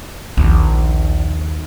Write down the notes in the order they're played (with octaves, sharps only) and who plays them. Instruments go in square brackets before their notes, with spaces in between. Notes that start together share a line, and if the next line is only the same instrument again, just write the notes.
[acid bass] A#1 [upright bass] D#2